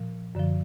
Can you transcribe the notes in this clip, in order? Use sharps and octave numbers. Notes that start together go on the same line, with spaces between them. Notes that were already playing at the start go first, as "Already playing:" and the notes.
Already playing: A#2 F3
F#2 D3 F3